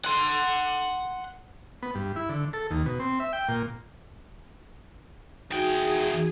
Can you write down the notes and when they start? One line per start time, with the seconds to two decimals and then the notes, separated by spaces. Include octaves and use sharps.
0.05 F#5 C6
1.83 B3
1.95 G2
2.16 E4
2.29 D3
2.53 A4
2.71 D#2
2.86 B2
3.00 C4
3.20 E5
3.33 G5
3.49 A#2
5.51 E2 D#4 F#4 G#4 G5